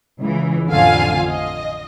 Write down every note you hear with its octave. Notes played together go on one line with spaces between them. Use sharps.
C#2 E3
A1 F2 D3 F4 F5 G#5
D#5